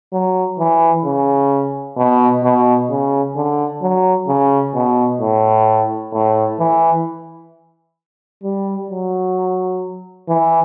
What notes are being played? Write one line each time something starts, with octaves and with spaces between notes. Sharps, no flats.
F#3
E3
C#3
B2
B2
C#3
D3
F#3
C#3
B2
A2
A2
E3
G3
F#3
E3